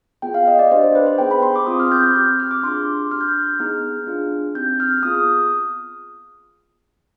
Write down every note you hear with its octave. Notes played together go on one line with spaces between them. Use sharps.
B3 F4 G#4 G5
F5
D#5
D5
D4 G4 C5
C5
B4
C5
B3 D#4 G#4 G5
B5
C6
D6
C4 F4 G#4 D#6
F6
G6
F6
C4 G4 D6
F6
D6
D4 F4 G#4 C6
D4 G4 F6
G6
F6
B3 D#4 G#4 F6
D4 F4 G#4
C4 D#4 G4 G6
F6
B3 F4 G#4 D#6
D#6